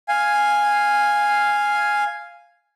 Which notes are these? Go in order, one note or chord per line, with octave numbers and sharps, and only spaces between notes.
F5 G#5